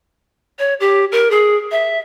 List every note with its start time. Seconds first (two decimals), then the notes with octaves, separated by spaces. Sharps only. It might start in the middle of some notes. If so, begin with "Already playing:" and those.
0.59 C#5
0.80 G4
1.12 A#4
1.31 G#4
1.72 E5